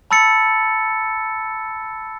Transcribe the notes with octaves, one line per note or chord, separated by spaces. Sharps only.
A5 B5 E6 A6 C#7